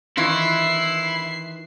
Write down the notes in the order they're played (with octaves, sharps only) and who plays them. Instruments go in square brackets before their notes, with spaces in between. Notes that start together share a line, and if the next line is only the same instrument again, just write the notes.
[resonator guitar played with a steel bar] D#3 E3 F4 [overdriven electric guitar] E4 [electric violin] C7